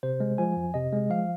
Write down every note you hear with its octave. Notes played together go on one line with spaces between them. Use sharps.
C3 C5
G#3
F3 G#5
F2
C3 D#5
G#3
F3 F5